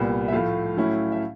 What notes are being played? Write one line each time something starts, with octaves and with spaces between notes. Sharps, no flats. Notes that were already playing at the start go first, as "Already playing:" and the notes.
Already playing: C2 A#2 G3 B3
E5
A2 F3 A3 F5
A2 F#3 A3 C#4 E4
E5